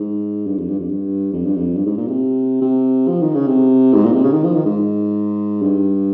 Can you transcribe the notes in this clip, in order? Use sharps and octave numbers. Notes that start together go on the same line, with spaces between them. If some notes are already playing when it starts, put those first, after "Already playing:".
Already playing: G#2
G2
F2
G2
F2
G2
F2
G2
F2
G2
G#2
A#2
C3
C3
F3
D#3
C#3
C3
G#2
A#2
C3
C#3
D#3
F3
D#3
G#2
G2